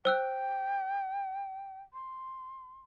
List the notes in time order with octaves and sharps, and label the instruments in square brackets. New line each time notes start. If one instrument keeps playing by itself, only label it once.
[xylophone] C5 E6 F#6 [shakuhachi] G5
[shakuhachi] C6